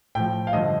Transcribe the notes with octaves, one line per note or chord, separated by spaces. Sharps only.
A2 F3 G5
F5
G2 D3 F3 D#5